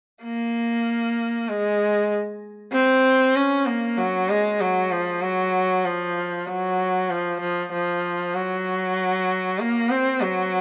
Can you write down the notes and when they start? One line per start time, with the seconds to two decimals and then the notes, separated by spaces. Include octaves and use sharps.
0.23 A#3
1.49 G#3
2.73 C4
3.35 C#4
3.66 A#3
3.98 F#3
4.29 G#3
4.60 F#3
4.91 F3
5.22 F#3
5.85 F3
6.47 F#3
7.10 F3
7.41 F3
7.72 F3
8.34 F#3
9.59 A#3
9.90 C4
10.21 F#3